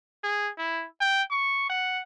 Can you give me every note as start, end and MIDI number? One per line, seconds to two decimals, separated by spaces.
0.23 0.50 68
0.58 0.86 64
1.00 1.23 79
1.30 1.65 85
1.70 2.02 78